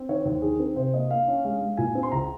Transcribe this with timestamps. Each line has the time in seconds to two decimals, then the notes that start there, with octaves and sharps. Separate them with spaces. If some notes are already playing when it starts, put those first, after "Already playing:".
Already playing: C4
0.09 D#3 C#5
0.20 C5
0.25 D#2
0.42 D#3 G#4
0.59 C4 A#4
0.76 C3 C5
0.94 A#3 D#5
1.10 A#3 F5
1.28 C#4
1.44 G#3 F5
1.61 G#3
1.77 A#2 G#5
1.95 C4
2.03 C6
2.12 C#2 A#5